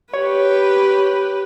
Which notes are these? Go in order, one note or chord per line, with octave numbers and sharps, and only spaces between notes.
G4 B4 C#5